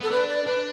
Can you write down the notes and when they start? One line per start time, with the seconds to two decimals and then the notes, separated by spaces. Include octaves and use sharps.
0.01 B3 A4
0.11 D4 B4
0.29 D5
0.46 D4 B4